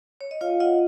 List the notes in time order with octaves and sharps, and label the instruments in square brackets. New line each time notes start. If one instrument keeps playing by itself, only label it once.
[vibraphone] C#5
D#5
F4 C#5 F5
F4 D#5 F#5